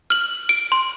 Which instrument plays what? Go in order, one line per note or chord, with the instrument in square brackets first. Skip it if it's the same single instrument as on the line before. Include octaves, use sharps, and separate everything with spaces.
[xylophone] F6 F#7
D7
C6